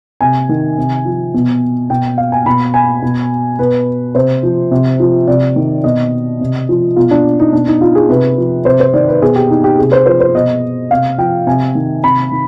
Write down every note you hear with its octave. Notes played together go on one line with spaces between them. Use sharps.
C3 G#5
D#3
C3
F3
B2
B2 G5
F5
G#5
B2 B5
G#5
B2
B2 B4
C3 C5
F3
C3
F3
C3 D5
D#3
B2 D#5
C3
F3
B2 F4
D4
D#4
B2 D4
D#4
F4
G#4
C3 B4
F3
C3 C5
C5
D#3 D5
B4
B2 G#4
G4
D#4
G4
C3 G#4
C5
F3 C5
C5
B2 D#5
C3 F5
F3 G5
C3 G#5
D#3
C3 B5
D#3